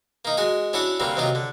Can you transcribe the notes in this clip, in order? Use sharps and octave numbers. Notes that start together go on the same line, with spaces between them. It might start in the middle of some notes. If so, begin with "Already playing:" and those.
A#3 D#4
G#3 F#4 G#5
C#4 D4 E4 F#4 F#5
D3 G3 A#3 C4
C3 D#3 F#3 A#3 F4
D3